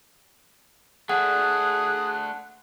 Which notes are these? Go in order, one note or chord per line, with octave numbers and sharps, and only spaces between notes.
A3 D4 G#4 F#5 F#6